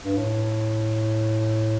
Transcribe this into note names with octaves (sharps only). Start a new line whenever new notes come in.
G2
A2